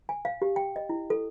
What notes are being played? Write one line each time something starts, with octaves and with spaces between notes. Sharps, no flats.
G#5
F5
G4
G5
D#5
E4
A4